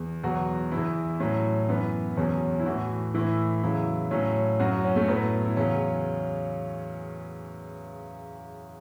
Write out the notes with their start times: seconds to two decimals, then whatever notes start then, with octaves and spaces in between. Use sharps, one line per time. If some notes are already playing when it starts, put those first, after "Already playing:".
Already playing: E2
0.24 E2 B2 F#3 F#4
0.71 E2 E3 E4
1.20 A2 F#3 C#4
1.69 F#2 E3 B3
2.17 E2 B2 F#3 C#4
2.59 E4
2.66 A2 E3 F#4
3.14 A2 E3 E4
3.63 E2 C#3 F#3 E4
4.11 A2 F#3 C#4
4.60 F#2 F#3 F#4
4.72 F#4
4.84 C#4
4.96 A3
5.08 A2 F#3 B3
5.45 E4
5.57 E2 C#3 F#3 C#4